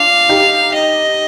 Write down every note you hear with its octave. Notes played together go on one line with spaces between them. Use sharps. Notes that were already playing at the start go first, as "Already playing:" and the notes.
Already playing: D4 F4 F5
D#4 G4
D#5